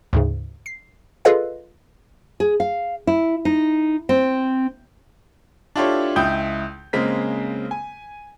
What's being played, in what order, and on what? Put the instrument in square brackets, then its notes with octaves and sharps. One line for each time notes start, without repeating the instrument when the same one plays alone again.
[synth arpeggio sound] D2 G#2 C#3
C7
F4 G#4 A4 B4 D#5 F5
[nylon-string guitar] G#4
F5
E4
D#4
C4
[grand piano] D4 E4 F4 G4 A4 C#5
C#2 E4 G5 D#6 G6
C#3 G#3 A#3 C4 B6
G#5